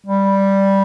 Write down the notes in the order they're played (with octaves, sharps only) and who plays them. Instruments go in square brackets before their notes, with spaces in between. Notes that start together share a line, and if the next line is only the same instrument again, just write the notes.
[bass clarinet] G3